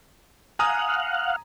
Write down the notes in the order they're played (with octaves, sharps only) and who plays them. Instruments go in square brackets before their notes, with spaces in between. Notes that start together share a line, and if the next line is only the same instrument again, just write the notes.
[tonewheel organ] F5 F#5 [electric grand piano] G#5 A#5 D#6